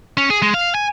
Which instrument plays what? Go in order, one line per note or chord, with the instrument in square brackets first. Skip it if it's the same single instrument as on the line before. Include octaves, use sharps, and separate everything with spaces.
[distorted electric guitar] C#4
G#4
G#3
F5
G#5